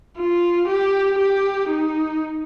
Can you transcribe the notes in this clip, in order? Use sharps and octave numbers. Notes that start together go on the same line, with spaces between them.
F4
G4
G4
D#4